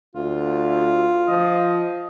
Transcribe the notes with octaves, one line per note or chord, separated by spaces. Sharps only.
D2 F4
F3 D#5